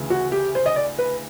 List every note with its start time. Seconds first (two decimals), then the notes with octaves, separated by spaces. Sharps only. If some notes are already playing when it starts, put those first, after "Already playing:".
Already playing: D2 C#3 E3
0.10 F#4
0.32 G4
0.55 C5
0.66 D#5
0.76 D5
0.99 B4